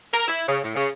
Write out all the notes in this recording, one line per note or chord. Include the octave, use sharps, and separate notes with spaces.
A#4
E4
C#3
A2
C#3